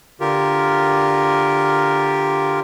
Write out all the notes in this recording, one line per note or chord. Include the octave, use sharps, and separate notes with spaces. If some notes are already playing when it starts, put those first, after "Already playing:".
D3 F4 G4 A#4